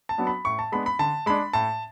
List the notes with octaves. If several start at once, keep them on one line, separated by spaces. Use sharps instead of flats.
A5
F#3 B3 D4
B5
A2 C#6
A5
G#3 B3 D4 B5
B5
D3 A5
G#3 D4 B5
A2 A5